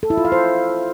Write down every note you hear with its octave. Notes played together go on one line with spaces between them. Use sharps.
A4
E4
F4
F5
C5